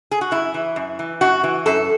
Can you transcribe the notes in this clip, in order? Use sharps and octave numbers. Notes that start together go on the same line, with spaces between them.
G#4
F#4
F#2 E4
E3
F#2
E3
F#2 F#4
E3
F#2 A4